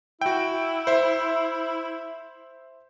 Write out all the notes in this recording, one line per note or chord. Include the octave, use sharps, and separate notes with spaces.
E4 F#4 G5
C5 E5